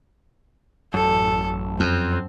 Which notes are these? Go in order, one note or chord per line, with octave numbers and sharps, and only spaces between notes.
A1 F#2 A4
F2 C4